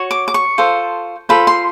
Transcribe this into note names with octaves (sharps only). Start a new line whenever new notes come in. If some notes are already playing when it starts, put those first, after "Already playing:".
Already playing: F#4 C#5
D6
D6
C#6
F4 A4 C5
F4 A4 C5 B5
C6